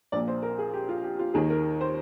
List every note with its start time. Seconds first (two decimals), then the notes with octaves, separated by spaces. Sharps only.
0.12 A#1 A#2 D5
0.28 C5
0.43 A#4
0.59 G#4
0.73 G4
0.89 F4
1.04 G4
1.19 F4
1.34 D#2 D#3 G#4
1.50 A#4
1.81 C5